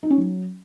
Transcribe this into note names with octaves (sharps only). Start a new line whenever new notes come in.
D#4
C#4
F#3